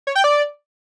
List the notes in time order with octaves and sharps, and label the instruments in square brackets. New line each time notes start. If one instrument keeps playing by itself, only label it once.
[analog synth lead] C#5
G5
D5